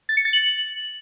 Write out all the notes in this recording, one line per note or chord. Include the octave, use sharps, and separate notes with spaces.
A6
C#7
A6
F#7